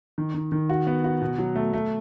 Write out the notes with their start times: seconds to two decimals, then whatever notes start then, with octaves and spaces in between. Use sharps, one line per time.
0.18 D#3
0.34 D#3
0.52 D#3
0.69 F#4
0.87 B3
1.04 F#4
1.22 B2
1.38 F#3
1.56 A3
1.73 A3